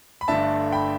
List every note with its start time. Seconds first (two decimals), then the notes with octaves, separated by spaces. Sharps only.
0.21 B5
0.28 G1 G2 D3 A3 D4 E5 A5
0.72 G5 B5